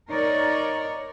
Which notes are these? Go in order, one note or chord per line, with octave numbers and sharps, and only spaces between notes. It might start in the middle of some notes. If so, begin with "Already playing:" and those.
D#4 A#4 C#5 D5